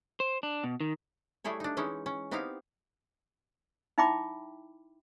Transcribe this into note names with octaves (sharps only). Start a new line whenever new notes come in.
C5
D4
B2
D#3
G3 A3 E4 G#4 C#5
D4 D#4
E3 G#3 C#4 D#4 E4
C#4
B3 C4 D#4 E4 G4 F5
D#4 E4 E5 G5 B5 D6